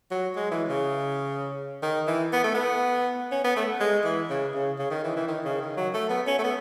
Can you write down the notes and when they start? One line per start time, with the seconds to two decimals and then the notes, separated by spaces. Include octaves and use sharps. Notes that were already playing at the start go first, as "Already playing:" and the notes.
0.11 F#3
0.36 G#3
0.51 E3
0.68 C#3
1.83 D#3
2.07 E3
2.33 B3
2.44 A3
2.54 B3
3.32 C#4
3.44 B3
3.56 A3
3.80 G#3
4.04 E3
4.30 C#3
4.55 C#3
4.79 C#3
4.91 D#3
5.04 E3
5.16 E3
5.28 D#3
5.45 C#3
5.61 D#3
5.77 F#3
5.94 A3
6.10 B3
6.27 C#4
6.39 A3
6.44 B3